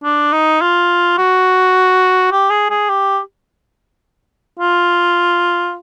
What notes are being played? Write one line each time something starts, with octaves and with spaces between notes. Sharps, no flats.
D4
D#4
F4
F#4
G4
G#4
G#4
G4
F4